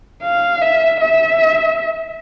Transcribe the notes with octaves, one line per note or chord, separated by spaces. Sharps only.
F5
E5
E5